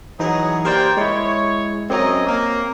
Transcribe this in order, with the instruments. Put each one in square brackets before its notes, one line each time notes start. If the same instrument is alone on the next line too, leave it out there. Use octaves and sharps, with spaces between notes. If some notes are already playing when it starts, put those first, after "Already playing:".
[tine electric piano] E3 D#4 [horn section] F#3 G#4
[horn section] A#3 A#4 G5 [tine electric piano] G4 C5 D5
[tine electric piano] G#3 E4 [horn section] C#5
[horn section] F#2 D#5 [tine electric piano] C4 C#5 A#5
[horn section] A#3